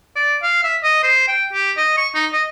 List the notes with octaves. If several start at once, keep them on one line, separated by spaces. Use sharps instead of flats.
D5
F5
E5
D#5
C5
G5
G4
D#5
C#6
D#4
D#5